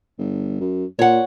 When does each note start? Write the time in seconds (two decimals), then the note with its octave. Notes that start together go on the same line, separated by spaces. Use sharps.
0.19 G1
0.60 F#2
0.99 A#2 C#5 F#5